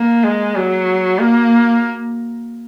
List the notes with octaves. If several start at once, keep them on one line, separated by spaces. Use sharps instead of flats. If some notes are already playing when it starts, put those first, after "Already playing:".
Already playing: A#3
G#3
F#3
A#3